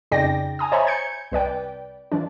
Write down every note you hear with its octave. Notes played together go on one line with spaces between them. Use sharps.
F2 C#3 D#4 D5 G5 A#6
G#5 A#5 D#6
C5 C#5 E5 G#5 A#5 B5
G6 G#6 C#7
C2 B4 D5 G5
E3 F3 D4